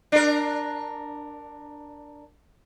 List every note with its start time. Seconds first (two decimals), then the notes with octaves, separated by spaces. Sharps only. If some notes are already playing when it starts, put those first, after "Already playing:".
0.12 D4 A#4